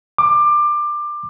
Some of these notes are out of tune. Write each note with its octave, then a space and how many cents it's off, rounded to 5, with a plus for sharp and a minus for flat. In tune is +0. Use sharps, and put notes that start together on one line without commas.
D6 +20